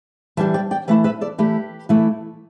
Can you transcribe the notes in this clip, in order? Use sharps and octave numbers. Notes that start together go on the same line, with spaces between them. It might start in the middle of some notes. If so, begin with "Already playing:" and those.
E3 G3 D4 E5 A5
D5 G5
D5 G5
E3 A3 E4 B4 E5
B4 E5
A4 D5
E3 A3 E4 G4 B4
E3 A3 E4